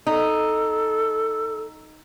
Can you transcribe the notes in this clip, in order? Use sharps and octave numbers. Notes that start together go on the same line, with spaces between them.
D#4 A4